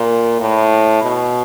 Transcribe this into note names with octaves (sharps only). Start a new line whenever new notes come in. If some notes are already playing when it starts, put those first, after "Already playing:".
Already playing: A#2
A2
B2